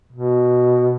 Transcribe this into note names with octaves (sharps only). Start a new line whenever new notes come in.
B2